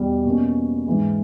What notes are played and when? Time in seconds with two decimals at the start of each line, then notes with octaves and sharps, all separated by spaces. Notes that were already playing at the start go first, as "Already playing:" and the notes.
Already playing: E2 B2 G3
0.25 B2 A#3 C#4
0.86 G#2 E3 G#3